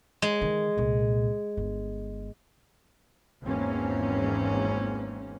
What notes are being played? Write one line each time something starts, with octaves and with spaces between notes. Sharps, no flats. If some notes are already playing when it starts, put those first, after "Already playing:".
G#3
D#3 E3
C2 A#2
G1
G#1 E2 E3 A#3 C4 C#4